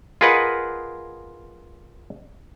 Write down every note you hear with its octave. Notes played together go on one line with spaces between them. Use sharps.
F4 G#4 A#4 B4 D#5 F#5